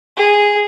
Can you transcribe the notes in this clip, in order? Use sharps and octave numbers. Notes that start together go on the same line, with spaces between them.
G#4